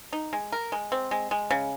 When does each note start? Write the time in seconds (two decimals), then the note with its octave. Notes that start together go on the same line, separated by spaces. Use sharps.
0.13 D#4
0.33 G#3
0.52 A#4
0.72 G#3
0.92 C4
1.11 G#3
1.31 G#3
1.51 C#3